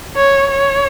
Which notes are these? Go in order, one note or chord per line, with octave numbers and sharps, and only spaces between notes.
C#5
C#5